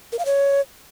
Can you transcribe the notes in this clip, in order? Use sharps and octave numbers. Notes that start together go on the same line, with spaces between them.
A#4
F5
C#5